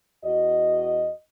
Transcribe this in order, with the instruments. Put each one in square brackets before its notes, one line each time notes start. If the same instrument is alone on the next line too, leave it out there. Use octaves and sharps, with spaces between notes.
[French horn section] E2 F#4 D#5